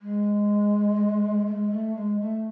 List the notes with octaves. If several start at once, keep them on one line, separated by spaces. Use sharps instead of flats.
G#3
A3
G#3
A3
G#3
A3